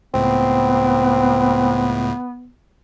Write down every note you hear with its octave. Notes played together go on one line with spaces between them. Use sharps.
C#2 A2 B3 C4